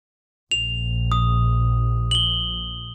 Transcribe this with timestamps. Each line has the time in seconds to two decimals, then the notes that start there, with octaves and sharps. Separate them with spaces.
0.51 A#1 F7
1.12 D#6
2.11 F#7 G7